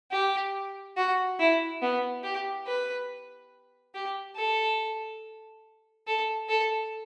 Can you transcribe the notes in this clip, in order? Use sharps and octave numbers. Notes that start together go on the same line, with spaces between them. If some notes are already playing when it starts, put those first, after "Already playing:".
G4
F#4
E4
B3
G4
B4
G4
A4
A4
A4